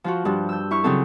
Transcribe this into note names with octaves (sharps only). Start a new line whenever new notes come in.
F3 F4 F#4
G2 F3
E6 G6
E4 C#6 F6
C#3 F#3 C4 A4